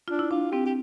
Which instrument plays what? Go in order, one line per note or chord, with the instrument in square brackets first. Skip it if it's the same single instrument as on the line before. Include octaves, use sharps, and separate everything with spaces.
[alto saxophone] D4 [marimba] F4
[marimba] E4
[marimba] D4 [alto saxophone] F4
[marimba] C4 [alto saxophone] G4
[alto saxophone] G4